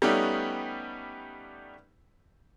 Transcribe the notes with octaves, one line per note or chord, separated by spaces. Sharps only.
G3 A3 B3 C#4 D#4 G4